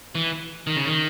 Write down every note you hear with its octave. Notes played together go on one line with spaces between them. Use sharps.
E3
D#3
C#3
D#3